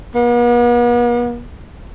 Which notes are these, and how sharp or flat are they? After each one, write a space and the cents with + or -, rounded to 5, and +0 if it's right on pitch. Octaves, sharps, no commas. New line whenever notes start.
B3 -45